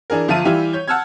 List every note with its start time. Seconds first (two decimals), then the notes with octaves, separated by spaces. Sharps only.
0.10 E3 D4 G#4 A#4
0.28 G1 F3 F4 E5 A5 D#7
0.45 E3 G3 E4 F4 G4
0.73 C#5 G6
0.88 F#5 A5 E6 F6 G#6